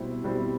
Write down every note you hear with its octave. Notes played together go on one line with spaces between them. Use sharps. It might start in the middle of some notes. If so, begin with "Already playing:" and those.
Already playing: B2 G3 C4 E4
B2 G3 C4 E4